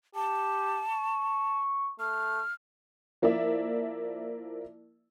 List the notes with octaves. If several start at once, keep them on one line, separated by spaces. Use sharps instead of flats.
G4 A5
C#6
A3 F6
F3 A#3 E4 D5 E5